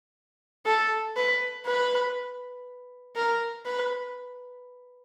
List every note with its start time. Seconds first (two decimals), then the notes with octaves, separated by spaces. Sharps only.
0.66 A4
1.16 B4
1.66 B4
3.16 A#4
3.65 B4